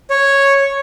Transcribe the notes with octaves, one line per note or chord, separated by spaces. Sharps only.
C#5